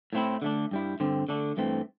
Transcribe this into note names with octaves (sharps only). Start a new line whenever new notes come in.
A2 A3 C4 E4
D3 A3 D4
G2 G3 E4
G2 D3 C4
D3 A3 D4
G2 E3 A3 C4